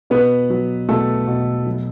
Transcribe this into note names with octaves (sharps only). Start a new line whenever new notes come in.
B2 B3 B4
F#3
B2 A3 A4
B2
F#3